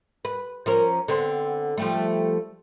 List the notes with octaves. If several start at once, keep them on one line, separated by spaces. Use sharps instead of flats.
B4
F3 C#4 A#4
D3 B3 C4
F3 G3 A3